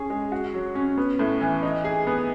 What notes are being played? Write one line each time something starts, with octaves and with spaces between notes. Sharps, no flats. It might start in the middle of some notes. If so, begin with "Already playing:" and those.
Already playing: C#4 G#4
G#3
F#4
F#3
C#4
B3
A2
E3
D#4
G#4
B3